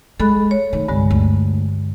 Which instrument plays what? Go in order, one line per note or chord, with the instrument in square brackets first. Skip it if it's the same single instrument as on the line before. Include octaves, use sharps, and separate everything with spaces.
[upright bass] G#3 [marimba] A4 B5 F#6
[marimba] C#5
[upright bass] D#3 A3
[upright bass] C2 [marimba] G2 D3 G#3
[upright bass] D2